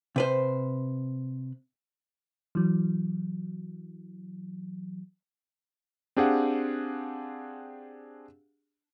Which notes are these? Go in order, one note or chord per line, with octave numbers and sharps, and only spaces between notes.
C3 B4 C5
E3 F#3
C4 D4 G4 G#4 F5 F#5